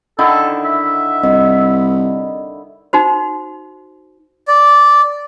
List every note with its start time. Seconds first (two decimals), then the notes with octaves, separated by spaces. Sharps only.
0.19 D3 D#3 E4 A4
0.65 E5
1.24 C2 D#5
2.93 D#4 F#4 C5
4.48 D5